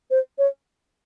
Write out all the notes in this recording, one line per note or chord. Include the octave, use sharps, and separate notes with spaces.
C5
C#5